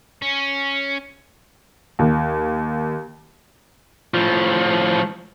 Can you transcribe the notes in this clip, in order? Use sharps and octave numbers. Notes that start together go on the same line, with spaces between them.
C#4
D#2
A2 F3